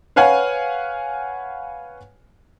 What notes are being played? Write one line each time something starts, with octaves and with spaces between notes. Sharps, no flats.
B4 C#5 F5 F#5 G#5